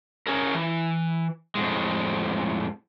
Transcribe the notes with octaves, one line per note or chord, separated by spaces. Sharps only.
C#4 G#4 A#4
E3
F2 A2 G#3